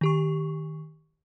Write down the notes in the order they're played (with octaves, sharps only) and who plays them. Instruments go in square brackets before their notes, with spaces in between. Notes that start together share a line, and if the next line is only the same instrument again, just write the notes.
[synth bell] D#3 G4 C#6